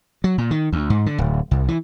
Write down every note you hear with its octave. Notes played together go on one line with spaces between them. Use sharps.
F#3
A#2
D#3
D2
G#2
D3
D1
C2
E3